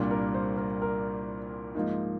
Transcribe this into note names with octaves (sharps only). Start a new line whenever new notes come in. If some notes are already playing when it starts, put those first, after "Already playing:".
Already playing: C2 A#2 G3 D4
A#4
C5
A#4
A#4
G#2 F3 A#3 D#4